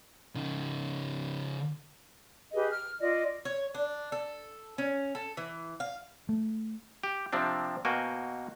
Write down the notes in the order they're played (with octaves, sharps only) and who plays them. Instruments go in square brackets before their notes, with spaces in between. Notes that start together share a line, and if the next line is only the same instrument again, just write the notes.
[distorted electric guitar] C#3 D#4
[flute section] G4 G#4 B4 D#5
F6
F4 D5 D#5
[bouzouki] C#5
D4
A4
C#4
A4
E3
F5
[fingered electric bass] A3
[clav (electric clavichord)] G4
C3 F3 C4 D4
B2 A#3 F#4 G5 G#5